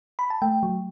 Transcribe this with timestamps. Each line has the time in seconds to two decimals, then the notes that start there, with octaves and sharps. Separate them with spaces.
0.19 B5
0.30 A5
0.42 A3 G5
0.63 F#3